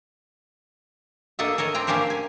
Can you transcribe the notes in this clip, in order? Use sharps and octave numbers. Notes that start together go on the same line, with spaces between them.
A#3 D4 A4 D#5 E5
A4 A#4 C#5 D#5
C4 D4 G5 A#5
A#3 C#4 D4 G4 A#4 C5
G#5